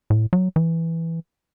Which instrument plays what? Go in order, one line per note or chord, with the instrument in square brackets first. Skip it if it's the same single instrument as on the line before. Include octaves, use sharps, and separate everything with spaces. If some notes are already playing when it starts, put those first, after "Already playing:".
[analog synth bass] A2
F#3
E3